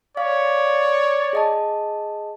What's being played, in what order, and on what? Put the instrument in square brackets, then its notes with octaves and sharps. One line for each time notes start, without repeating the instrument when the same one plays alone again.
[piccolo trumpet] C#5 [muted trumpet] D5 [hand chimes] F5
[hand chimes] G#4 D#5 A5